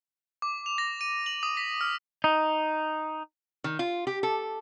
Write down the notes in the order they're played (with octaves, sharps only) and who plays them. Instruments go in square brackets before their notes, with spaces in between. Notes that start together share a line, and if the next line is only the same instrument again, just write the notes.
[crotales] D6
F7
A#6
D#7
F#7
D#6
B6
F6
[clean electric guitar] D#4
[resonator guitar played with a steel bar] D#3
F4
G4
A4